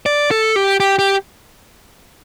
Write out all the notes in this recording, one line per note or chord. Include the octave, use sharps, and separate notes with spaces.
D5
A4
G4
G4
G4